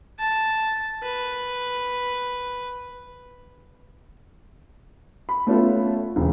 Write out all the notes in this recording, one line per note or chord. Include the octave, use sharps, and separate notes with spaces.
A5
B4
B5
A3 B3 C#4 F4 A4
E1 C#3 E3